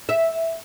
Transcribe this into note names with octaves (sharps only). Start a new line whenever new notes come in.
E5